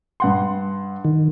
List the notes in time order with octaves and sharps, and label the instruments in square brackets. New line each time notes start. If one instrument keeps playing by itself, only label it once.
[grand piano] G2 F#5 C6
[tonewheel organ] D#3